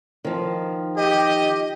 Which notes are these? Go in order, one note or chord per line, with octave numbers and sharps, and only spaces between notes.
D#3 F3
G4 D#5